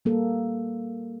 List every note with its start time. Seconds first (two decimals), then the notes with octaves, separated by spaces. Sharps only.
0.05 G3 A#3 A4